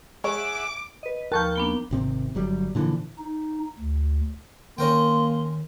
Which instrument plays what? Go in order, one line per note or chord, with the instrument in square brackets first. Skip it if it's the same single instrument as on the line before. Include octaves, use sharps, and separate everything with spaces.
[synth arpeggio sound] G#3 [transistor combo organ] G#4 E5 F#5 [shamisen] C#5 [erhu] D6
[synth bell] B4 D#5
[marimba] D#2 F3 F6 [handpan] A#4 [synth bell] A5 C#6 G6
[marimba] A#3 B3 D4 [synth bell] G7
[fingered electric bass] G#1 C3 C4
G1 F#3 G3
A#2 D3 E3 F3
[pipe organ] D#4
D2
[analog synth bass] D#3 [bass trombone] A#3 [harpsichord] C#4 A#4 G5 [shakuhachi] C6